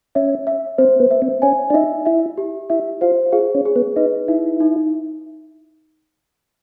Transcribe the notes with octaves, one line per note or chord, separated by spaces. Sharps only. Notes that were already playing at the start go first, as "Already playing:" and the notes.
C#4 E5
E5
C4 C5
B3
E5
C4
C#4 G#5
D4
D#4 E5
E4 E5
G4
E4 E5
F4 C5
F4 G#4
C#4
G#4
B3
D#4 B4
D#4 E4
D#4